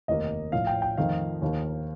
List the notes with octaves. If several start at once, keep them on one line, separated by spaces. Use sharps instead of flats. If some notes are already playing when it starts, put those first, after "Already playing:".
F1 D#2 D#3 A#3 D#5
A#1 A2 F3 F5
G5
G5
F2 D#3 A3 F5
D#2 D#3 A#3